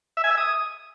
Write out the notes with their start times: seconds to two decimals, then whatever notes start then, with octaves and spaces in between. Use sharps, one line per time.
0.17 E5
0.24 G#5
0.31 E5
0.38 D#6